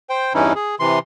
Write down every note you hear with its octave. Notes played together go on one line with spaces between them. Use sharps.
C5 G5
E2 G2 E3 C#4 D#4 E4
G#4
C3 E3 C6